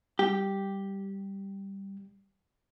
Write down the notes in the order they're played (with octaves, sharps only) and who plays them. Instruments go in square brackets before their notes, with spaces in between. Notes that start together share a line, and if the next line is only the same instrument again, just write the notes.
[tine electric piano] G3 [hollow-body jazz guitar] G4